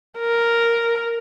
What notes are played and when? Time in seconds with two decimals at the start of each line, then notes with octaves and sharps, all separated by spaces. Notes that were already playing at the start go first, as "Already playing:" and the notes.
0.19 A#4